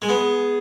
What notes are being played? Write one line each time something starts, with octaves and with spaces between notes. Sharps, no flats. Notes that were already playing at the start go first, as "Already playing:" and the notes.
G#3
B3 G#4